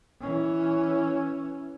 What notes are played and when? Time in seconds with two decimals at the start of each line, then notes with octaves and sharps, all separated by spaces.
0.21 E3 C#4